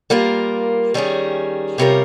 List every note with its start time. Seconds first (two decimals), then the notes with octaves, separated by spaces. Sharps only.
0.10 G3 A#3 F4 A#4
0.94 D#3 G3 C#4 G#4
1.78 C3 G3 C#4 F4 A#4